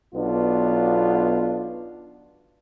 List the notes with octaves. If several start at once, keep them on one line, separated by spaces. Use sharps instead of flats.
B1 B3 D4 F4